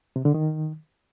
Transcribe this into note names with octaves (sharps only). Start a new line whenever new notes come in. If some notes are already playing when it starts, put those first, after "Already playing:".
C3
D3
D#3